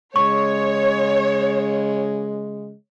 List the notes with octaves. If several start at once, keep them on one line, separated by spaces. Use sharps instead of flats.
C#3 G#3 C#5 C#6